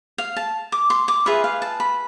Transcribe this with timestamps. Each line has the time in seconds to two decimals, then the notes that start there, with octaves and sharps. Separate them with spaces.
0.18 F5
0.36 A5
0.72 D6
0.90 C6
1.08 D6
1.26 F4 G#4 B4 E5
1.44 F5
1.62 A5
1.80 B5